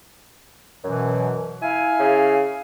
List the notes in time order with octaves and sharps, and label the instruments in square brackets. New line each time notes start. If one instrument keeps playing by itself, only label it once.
[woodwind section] F#2 B2 E3
E4 F5 G#5
[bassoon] C#3